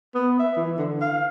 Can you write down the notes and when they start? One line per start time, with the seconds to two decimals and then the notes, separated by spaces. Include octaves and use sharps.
0.14 B3
0.39 E5
0.57 E3
0.78 D3
1.01 F5